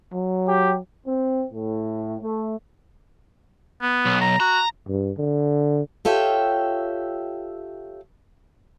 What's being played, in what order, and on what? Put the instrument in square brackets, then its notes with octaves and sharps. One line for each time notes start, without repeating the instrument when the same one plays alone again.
[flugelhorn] F#3
[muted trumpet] G4
[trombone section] C4
A2
A3
[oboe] B3
[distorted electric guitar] B1
[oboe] A#5
[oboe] F#4 [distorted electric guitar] A#5
[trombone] G2
D3
[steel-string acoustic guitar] F4 G4 A4 C#5 E5 G5